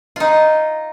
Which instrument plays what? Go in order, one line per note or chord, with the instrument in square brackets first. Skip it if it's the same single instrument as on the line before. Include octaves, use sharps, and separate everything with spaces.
[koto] D#4 F4